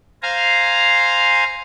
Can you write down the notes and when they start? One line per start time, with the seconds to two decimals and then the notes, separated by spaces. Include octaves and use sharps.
0.22 C5 F5 G#5 A#5